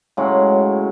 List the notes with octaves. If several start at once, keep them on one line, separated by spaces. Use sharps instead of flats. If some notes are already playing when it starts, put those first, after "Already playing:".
A2 C#3 F#3 G#3